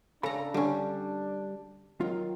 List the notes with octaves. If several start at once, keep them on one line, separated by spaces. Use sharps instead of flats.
C#3 D4 A4 A#5 B5
D3 G3 C#4
D#3 F#3 F4